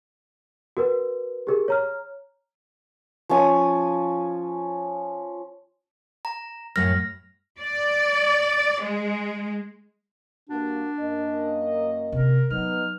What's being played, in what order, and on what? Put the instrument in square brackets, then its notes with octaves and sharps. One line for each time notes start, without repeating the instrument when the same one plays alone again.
[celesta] F#4 A#4 B4
G4 G#4 A#4
C#5 A#5 F6
[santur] F3 C#4 G#5 D#6
[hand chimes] A#5
[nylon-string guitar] F#2 A2 F#3 [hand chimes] F6 A#6
[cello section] D5
G#3
[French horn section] G2 A#3 F#4 [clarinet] D4
[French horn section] F#2 A#3 D#5
[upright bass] C3 [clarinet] A#4
[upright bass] F#3 [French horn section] B3 D#4 [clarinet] F6